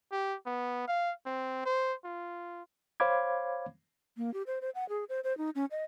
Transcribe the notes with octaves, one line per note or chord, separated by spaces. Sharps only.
G4
B3
F5
C4
C5
F4
C5 C#5 F5 B5 D6 G#6
A#3
G4
C5
C5
F#5
G#4
C5
C5
D#4
C#4
D#5